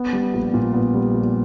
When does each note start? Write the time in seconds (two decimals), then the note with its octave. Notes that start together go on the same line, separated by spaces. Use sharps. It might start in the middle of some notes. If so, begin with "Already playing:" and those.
Already playing: B3
0.13 G3
0.34 A#1
0.54 A#2
0.74 B3
0.94 G3
1.15 A#1